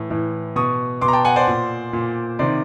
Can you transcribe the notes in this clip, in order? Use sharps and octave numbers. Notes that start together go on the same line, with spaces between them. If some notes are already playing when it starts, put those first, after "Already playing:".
Already playing: A2 E3
A2 E3
B2 C#6 D#6
B2 C6 D6
A#5
G5 A5
F#5 G#5
C5 D5
A#2
A#2
C3 D#3 C5 D5